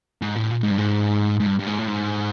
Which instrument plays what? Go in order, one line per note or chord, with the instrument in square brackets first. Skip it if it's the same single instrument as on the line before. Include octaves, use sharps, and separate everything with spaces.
[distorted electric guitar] G#2
A2
A#2
G#2
G2
G#2
G#2
G2
G2
G#2
A2
G#2